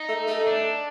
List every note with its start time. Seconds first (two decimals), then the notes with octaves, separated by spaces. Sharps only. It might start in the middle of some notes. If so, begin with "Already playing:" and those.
Already playing: D#4
0.09 A3
0.27 A3
0.47 D4